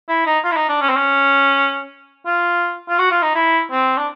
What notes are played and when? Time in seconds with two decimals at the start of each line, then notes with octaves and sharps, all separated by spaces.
0.09 E4
0.26 D#4
0.44 F4
0.52 E4
0.56 D#4
0.69 D4
0.81 C#4
0.89 C4
0.96 C#4
2.26 F4
2.89 F4
2.99 F#4
3.11 F4
3.22 D#4
3.35 E4
3.71 C4
3.97 D4